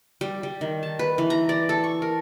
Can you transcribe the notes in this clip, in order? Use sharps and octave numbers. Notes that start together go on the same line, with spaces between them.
G3
G3
D#3
A5
B4
E3
A#5
D5
A4
C#6
A#4